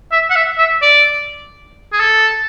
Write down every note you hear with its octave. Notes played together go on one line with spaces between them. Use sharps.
E5
F#5
E5
E5
D5
G#4
A4